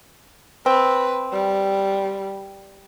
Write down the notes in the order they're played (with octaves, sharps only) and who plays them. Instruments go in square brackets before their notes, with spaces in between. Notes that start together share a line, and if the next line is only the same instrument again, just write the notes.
[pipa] C4 [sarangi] B4
[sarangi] G3